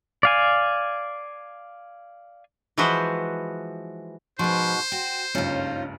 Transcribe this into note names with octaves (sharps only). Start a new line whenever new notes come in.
D5 F5 G#5
E3 F3 G#3 F#4 B4 C5
G#2 B2 F3 F#4 B4 C5 C6
F#4 G5
F#1 C#2 G2 C#4 D#4 F4